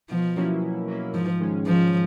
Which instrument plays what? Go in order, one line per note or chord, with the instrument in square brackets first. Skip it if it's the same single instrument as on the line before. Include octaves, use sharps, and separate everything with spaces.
[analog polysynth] B2 [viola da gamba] F3
[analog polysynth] F#3 A#3 C#4 E4
B2
F#3 A#3 C#4 E4
[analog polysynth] G#2 [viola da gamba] F3
[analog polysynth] D#3 G#3 C#4
[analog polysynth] G#2 [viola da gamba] F3